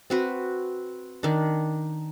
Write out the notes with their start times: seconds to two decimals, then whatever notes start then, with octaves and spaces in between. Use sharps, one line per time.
0.10 C4 F#4 B4
1.23 D#3 D4